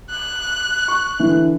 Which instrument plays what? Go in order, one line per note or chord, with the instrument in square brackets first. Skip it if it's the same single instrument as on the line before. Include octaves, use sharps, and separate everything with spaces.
[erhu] F#6
[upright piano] C#6
D3 E3